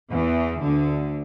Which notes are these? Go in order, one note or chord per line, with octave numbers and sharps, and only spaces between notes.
E2 E3
D2 D3